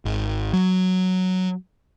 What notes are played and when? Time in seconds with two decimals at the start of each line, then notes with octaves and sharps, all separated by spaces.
0.05 G#1
0.53 F#3